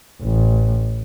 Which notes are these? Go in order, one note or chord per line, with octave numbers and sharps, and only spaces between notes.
A1